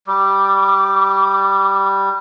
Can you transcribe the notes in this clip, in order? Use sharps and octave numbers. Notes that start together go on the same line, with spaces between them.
G3 D6